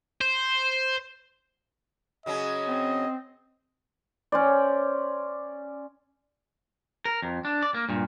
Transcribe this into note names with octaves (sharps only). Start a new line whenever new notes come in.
C5
C#3 F#3 C#4 D#5
C4
C#4 C5 D5
A#4
F2
D4
D5
A#3
G2 A#2